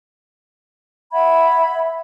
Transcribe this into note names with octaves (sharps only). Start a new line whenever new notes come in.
E5 F#5 B5 G#6